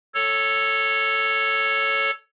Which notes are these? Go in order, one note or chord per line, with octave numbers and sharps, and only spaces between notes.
A4 C#5